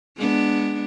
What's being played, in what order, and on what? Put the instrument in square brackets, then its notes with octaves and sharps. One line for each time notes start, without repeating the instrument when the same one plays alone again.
[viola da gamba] G#3 B3 D4